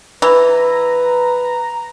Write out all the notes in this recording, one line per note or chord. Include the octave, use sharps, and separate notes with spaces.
E3 B4 A#5